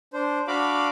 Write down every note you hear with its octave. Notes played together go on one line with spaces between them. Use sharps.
D4 C5
D4 F#4 F5 B5 D6